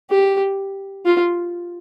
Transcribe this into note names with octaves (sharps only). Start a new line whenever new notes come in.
G4
F4